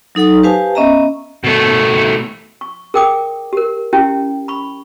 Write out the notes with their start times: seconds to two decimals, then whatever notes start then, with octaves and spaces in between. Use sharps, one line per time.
0.15 F#3 D#4 A4 F#5 D#6
0.43 G4 B4 C5 F5 G#5 A5
0.75 B3 C#4 D#5 E5 A#5
1.44 B2 A3
2.61 C#6
2.94 G#4 A#4 G5 D6 D#6
3.53 G4 A#4
3.93 C#4 E4 G4 G5
4.48 B5 C#6